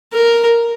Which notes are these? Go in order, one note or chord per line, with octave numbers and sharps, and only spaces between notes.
A#4